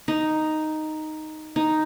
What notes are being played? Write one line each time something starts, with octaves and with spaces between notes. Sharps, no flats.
D#4
D#4